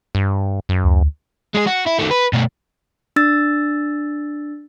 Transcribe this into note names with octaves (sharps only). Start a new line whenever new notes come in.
G2
F#2
D2
G#3 G#4
F#4
E4
D#3 A3
B4
B2 A3
D4 E6 A6